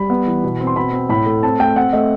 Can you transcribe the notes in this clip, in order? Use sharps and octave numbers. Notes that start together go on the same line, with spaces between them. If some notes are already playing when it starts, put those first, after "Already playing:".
Already playing: G3 B5
B3
E3
B2
C4
C6
B2 B5
C4
A2 B5
A3
C4 A5
A3 G5
C4 F#5
A3 D#5